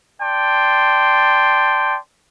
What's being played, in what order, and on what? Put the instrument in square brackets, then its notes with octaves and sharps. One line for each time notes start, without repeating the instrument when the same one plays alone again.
[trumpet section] D5 G5 A5 C6